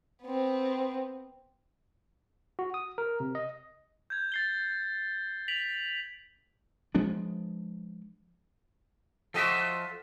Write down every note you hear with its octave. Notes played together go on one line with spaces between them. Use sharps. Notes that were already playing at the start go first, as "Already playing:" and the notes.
B3 C4
F#4
D#6
A#4
C3
D#5
G6 G#6
A6 C7 G7
B6 D7 F7 F#7
F3 G#3 B3 D4
F3 F4 F#4 A4 D#5 E5